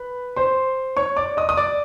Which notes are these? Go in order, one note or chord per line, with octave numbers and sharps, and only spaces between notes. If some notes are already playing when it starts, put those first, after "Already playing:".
Already playing: B4 B5
C5 C6
C#5 C#6
D5 D6
D#5 D#6
D#6
D5 D6